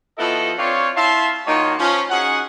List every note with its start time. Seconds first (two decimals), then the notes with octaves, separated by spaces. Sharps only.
0.18 F3 B3 E4 F#4 A4 D#5
0.58 C4 D4 F4 C#5
0.96 E4 E5 F5 A5 C6
1.46 D#3 A#3 D#4 F4 F#4 C#5
1.79 F3 C#4
2.10 C#4 D#4 F#4 G#4 F#5